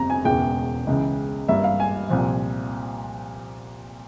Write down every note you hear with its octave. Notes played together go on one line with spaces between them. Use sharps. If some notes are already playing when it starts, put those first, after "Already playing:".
Already playing: G1 F2 C3 A#5
G#5
E1 E2 C#3 E3 G#3 G5
C#2 C#3 E3
G#1 G2 G3 A#3 E5
F5
G#5
C2 A#2 F3